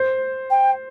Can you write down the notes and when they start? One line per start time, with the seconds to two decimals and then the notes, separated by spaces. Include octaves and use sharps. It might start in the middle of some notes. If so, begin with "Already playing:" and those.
Already playing: C5
0.50 G5